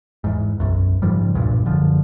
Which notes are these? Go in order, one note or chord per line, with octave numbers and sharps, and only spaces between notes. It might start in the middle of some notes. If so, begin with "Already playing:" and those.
E2 G#2
E1 B1 F#2
G#2 C#3 F3 G3
B1 E2 G2 A#2
F#1 D3 F3